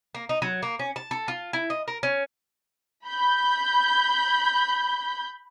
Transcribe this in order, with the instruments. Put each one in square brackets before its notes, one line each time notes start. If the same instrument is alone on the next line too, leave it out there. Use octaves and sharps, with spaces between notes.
[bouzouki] A#3
D#4
F#3
A#3
C#4
A5
A4
F4
E4
D#5
A#4
C#4
[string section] B5 G6